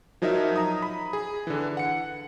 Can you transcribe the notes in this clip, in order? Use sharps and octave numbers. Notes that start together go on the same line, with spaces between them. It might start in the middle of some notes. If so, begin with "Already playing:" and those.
F3 F#3 D#4 A#4 E5
A#5 D#6
B5
G#4
D3 E3
F#5 C#7